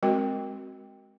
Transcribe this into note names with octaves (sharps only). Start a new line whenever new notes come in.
G#3 C4 F#4 A#4 G5